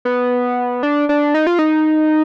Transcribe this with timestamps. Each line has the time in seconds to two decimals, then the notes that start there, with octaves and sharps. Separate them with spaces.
0.05 B3
0.83 D4
1.09 D4
1.34 D#4
1.47 F4
1.59 D#4